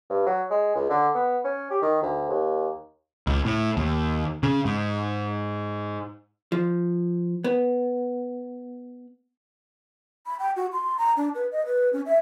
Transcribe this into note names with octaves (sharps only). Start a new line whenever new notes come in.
G2
F#3
G#3
C#2
D3
B3
C#4
G4
D#3
D2
D#2
C#2
A2
D#2
C#3
G#2
F3
B3
B5
G5
F#4
C6
A#5
D4
B4
D#5
B4
C#4
E5